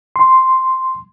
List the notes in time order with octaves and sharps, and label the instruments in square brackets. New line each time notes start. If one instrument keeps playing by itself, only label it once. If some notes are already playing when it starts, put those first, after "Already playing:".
[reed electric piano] C6